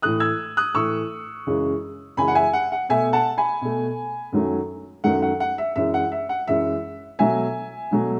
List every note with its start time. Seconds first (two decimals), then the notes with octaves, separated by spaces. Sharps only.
0.02 A2 E3 A3 D#6 F#6
0.20 E6 G#6
0.57 D#6 F#6
0.75 A2 E3 A3 C#6 E6
1.47 F#2 C#3 E3 G#3
2.17 F#2 C#3 E3 G#3 G#5 B5
2.28 F#5
2.35 E5 G#5
2.53 F#5
2.72 F#5
2.89 B2 A3 E5 G#5
3.13 F#5 A5
3.38 G#5 B5
3.62 B2 A3
4.32 F#2 D#3 F#3 A3
5.04 F#2 D#3 F#3 A3 F#5
5.22 F#5
5.40 F#5
5.58 E5
5.76 F#2 E3 G#3 E5
5.94 F#5
6.12 E5
6.29 F#5
6.47 F#2 E3 G#3 E5
7.19 B2 F#3 A3 E5 G#5
7.91 B2 F#3 A3